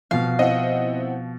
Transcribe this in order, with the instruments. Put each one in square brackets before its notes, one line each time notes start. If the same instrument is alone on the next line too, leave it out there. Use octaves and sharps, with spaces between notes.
[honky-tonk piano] C2 [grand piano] B2 F3 [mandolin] F5
[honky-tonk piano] C4 E4 F#5 [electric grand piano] D#5